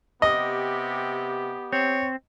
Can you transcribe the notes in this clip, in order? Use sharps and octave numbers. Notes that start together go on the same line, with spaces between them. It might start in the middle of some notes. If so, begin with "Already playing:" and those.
C3 B3 G4 D#5
C4 C#5